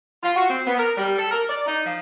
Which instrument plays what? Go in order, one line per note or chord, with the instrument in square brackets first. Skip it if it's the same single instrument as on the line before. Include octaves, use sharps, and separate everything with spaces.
[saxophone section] F4
F#4
C4
B3
A#4
G3
A4
A#4
D5
D#4
F3